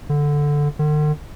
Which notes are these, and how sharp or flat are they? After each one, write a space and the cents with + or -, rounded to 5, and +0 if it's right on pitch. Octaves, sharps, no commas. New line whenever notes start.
D3 -5
D3 +45